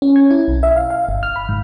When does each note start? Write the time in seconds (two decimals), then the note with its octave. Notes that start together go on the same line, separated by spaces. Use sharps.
0.02 C#4
0.16 G#6
0.30 E4
0.48 B1
0.63 E5
0.76 F5
0.90 F5
1.09 G1
1.23 F6
1.36 B5
1.49 G#2